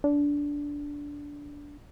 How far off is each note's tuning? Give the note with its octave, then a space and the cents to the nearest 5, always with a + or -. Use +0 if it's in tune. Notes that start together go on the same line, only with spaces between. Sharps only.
D4 -15